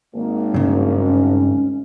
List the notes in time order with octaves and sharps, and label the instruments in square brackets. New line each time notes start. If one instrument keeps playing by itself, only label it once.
[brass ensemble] G#1 [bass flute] A#3
[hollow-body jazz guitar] G2 C#3
[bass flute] C#4